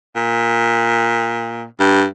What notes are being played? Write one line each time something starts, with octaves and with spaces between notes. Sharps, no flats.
A#2
G2